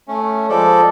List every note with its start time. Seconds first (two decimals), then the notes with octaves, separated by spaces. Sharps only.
0.08 A3 C#4
0.49 F3 G#3 A4 D5